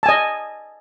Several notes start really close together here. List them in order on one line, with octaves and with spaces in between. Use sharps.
A5 G#5 D#5